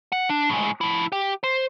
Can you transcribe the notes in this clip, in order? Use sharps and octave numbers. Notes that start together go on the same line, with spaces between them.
F#5
D4
A2 G#3
F3 E4
G4
C5